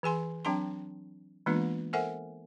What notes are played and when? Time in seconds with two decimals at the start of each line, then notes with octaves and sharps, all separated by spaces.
0.03 E3 G#4 G#5 C6
0.45 F#3 C4 D4 G5 A5 C6
1.46 E3 G#3 A#3 B3 D4 F4
1.93 A4 A#4 C5 E5 F#5 G#5